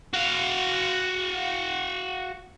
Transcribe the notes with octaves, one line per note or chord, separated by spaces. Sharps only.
F#4 F5